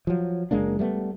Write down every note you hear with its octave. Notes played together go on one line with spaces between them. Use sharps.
F3 F#3
F#1 G#3 A#3 D4
G3 A3 B3